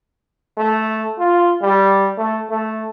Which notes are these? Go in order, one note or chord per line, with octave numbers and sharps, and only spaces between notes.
A3
F4
G3
A3
A3